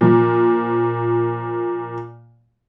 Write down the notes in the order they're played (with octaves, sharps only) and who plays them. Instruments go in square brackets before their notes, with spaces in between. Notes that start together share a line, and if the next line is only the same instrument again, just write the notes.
[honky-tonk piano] A#2 F3